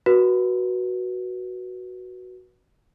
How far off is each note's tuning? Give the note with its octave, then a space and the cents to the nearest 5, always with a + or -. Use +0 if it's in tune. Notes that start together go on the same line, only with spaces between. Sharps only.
F#4 +0 B4 -25